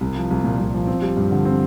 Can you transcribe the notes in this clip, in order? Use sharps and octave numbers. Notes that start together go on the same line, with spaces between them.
C2
F3
C2
A#2
C2
F3
C4
G3
G2
D3
C4